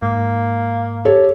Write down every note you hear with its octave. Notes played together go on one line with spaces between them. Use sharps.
G#2 A#3
G4 A4 C#5